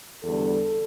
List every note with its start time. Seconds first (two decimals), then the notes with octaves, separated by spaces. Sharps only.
0.24 E2 D3 G3 A4